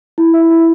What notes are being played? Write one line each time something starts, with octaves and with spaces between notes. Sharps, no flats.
E4
E5
E4